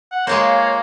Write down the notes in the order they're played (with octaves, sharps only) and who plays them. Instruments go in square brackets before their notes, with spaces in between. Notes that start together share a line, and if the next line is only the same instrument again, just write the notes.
[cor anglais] F#5
[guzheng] G#3 F4 C5 [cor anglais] A#3 [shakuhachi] C#5